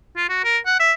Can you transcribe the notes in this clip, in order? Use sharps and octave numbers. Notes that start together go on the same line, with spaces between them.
F4
F#4
A#4
F#5
E5